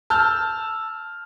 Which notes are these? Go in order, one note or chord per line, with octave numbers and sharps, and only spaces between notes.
A5 E6 F6 G6